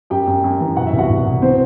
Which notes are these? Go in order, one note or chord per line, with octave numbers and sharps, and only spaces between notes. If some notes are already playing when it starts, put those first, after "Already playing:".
F#2 G4 G5
F#2
F#2
E3
B2 F#5
E5
C2
F#4 F#5
C2
B2
E3 C4 C5